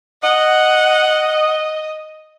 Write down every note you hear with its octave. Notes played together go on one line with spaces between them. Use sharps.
D#5 F#5